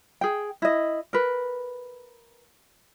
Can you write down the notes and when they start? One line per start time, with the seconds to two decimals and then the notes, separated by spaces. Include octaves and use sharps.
0.21 G#4 G5
0.62 E4 D#5
1.13 A#4 B4